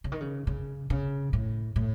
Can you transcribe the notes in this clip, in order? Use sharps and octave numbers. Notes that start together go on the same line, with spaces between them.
C#3
D#3
C#3
C#3
C#3
A2
A2